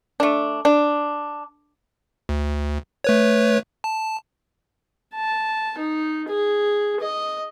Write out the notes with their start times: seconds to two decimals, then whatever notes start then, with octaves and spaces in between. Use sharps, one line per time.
0.20 A3 D4
0.65 D4
2.29 D2
3.04 A3 B4 C#5
3.84 A5
5.14 A5
5.78 D#4
6.28 G#4
7.01 D#5